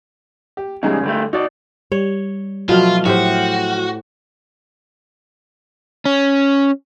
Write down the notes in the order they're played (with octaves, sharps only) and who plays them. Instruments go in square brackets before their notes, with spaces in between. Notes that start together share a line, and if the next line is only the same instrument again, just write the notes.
[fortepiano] G4
[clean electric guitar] E2 C#3 [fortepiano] G3 G#3 D#4
[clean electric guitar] G2 G3 A3 [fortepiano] D3
[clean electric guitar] D#4 D5 [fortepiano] F#4
[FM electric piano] G3 [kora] C#5
[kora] B2 A3 [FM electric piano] F3 F#3 F6 [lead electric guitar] F4
[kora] A2 G4 C5 [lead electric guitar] F#4
[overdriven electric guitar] C#4